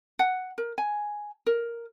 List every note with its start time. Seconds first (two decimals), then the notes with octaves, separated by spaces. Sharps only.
0.19 F#5
0.58 A#4
0.78 G#5
1.46 A#4